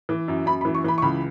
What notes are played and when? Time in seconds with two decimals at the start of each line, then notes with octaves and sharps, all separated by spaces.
0.09 E3
0.28 F#2
0.46 F#2 B5
0.61 B5
0.65 E3
0.75 C#6
0.84 E3 B5
0.98 C#6
1.02 C#2 B5